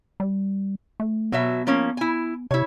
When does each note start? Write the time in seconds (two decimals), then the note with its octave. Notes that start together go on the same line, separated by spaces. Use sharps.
0.20 G3
1.00 A3
1.32 B2 F#3 B3 E5
1.67 F3 A#3 C#4
1.97 E4 G#5
2.51 C3 E4 C#5